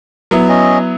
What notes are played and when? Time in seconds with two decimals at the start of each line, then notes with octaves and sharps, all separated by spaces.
0.31 F#3 B3 E4
0.49 C#4 D#5